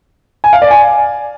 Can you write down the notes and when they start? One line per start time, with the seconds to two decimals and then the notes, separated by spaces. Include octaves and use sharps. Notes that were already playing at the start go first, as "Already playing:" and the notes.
0.44 G#5
0.53 F5
0.62 D5
0.71 G#5